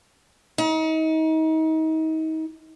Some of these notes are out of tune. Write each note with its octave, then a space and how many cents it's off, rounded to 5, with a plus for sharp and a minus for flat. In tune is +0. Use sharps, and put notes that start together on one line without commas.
D#4 +35